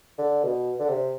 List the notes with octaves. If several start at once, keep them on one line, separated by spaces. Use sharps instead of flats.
D3
B2
D3
C3